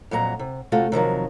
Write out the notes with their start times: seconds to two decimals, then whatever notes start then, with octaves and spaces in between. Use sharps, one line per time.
0.11 F2 A#2 F#3 A#5
0.39 C3
0.72 C3 A3 F4 F#4
0.92 C3 D#3 F3 F#3